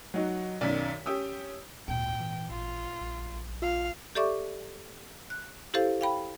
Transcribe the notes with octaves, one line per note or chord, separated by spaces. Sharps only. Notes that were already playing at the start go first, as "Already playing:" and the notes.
F#3 D#4 F#4
B1 F#2 D#3 D5 B6
C#4 G4 D#6 E6
G#1 D2 A#2 G5
E3
A1 F4
A#1
F4 F5
G4 A4 D5 E5 C#6 D6
F#6
E4 G4 A4 C5 F5
F5 G5 B5